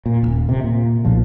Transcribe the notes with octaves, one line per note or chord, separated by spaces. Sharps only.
A#2
D#1 G#1
C3
A#2
B1 A#2 F3